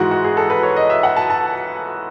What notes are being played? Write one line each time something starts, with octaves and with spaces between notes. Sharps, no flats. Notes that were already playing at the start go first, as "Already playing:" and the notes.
Already playing: G#2 E3 G#3 F#4
F#4
G#4
A4
B4
C#5
D#5
E5
F#5
A5
A5